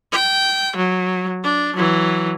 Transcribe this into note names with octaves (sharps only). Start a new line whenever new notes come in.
G5
F#3
D4
E3 F#3